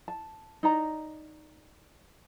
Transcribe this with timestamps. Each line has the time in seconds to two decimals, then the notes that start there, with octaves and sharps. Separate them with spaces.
0.08 A5
0.63 D#4 D5 A#5